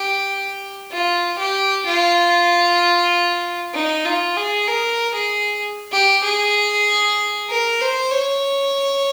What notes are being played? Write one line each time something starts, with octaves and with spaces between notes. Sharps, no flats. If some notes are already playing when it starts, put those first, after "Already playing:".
Already playing: G4
F4
G4
F4
D#4
F4
G#4
A#4
G#4
G4
G#4
A#4
C5
C#5